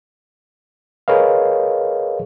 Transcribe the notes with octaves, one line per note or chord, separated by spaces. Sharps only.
G#4 A#4 B4 C#5 D#5 F5